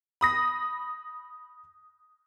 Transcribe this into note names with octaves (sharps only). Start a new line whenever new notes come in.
B5 D#6 A#6